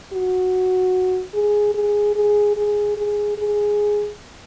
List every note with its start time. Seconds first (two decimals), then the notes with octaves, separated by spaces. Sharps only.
0.13 F#4
1.34 G#4
1.74 G#4
2.15 G#4
2.56 G#4
2.97 G#4
3.38 G#4